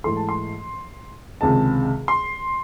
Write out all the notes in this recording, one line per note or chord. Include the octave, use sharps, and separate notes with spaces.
G#2 E3 A3 C6
A5
C6
C#2 C3 D#3 G#3 A5
C6